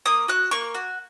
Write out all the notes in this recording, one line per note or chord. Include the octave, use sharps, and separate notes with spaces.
A#3 D#6
F#4 F#6
A#3 C#6
F#4